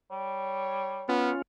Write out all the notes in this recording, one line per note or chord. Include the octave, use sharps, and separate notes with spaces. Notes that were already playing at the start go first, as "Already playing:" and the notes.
G3 C#5
B3 C#4 F4